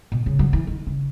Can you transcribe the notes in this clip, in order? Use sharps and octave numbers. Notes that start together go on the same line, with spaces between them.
B2
C#3
F#3
E3
D#3
C#3